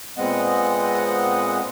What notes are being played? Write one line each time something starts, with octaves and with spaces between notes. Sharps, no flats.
A#2 G#3 B3 C4 D#5 F#5